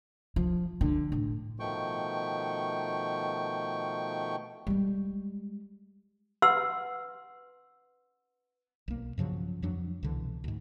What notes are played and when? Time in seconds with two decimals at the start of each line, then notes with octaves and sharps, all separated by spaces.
0.36 F3
0.81 D3
1.12 A2
1.60 B2 D#3 F3 A3 G5 C#6
4.67 G3 G#3
6.42 B4 F#5 C6 E6
8.88 B1 A#3
9.18 G2 C#3 F3 F#3
9.62 F2 F3 F#3 D4
10.03 C2 B2 D3 E3
10.44 D2 G#2